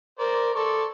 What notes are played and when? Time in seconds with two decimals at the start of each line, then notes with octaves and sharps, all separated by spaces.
0.19 A#4 C5 D5
0.55 A4 D5 C6 C#6